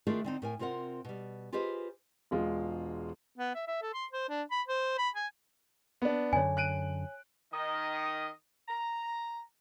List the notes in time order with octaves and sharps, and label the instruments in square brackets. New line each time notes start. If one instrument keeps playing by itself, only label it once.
[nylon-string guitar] D#3 A3 D4 F4 G#4 A#4
D3 C4 D#4
A2 A#4 G#5
C3 C4 F4 A#4 F#5
B2 G3
F4 G4 G#4 B4 C5 D#5
[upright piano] E1 G#3 F4
[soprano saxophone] B3
E5
E5
A4
C6
C5
D4
B5
C5
B5
G#5
[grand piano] B3 D4
[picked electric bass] F#2 D3 [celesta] C#5 G#5
[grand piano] F#6 D7 D#7
[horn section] D#3 D#5
A#5